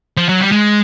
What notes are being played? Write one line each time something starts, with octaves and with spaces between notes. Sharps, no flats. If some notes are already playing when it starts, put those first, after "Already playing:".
F3
F#3
G3
G#3